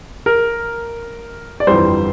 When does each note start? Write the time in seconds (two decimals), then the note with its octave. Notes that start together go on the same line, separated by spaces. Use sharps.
0.26 A#4
1.60 D5
1.67 G1 F2 E3 G3 C5